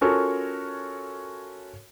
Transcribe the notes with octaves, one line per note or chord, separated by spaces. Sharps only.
C#4 F4 F#4 A4 A#4 C#5